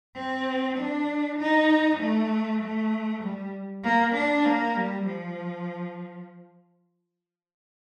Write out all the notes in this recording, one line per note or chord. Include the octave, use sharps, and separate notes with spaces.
C4
D4
D#4
A3
A3
G3
A#3
D4
A#3
G3
F3